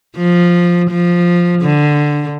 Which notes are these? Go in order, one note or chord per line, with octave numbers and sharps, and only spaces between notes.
F3
F3
D3